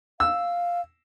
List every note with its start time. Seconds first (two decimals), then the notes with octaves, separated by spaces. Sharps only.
0.20 F5 E6